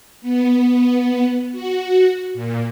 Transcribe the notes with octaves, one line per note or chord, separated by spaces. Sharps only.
B3
B3
F#4
A#2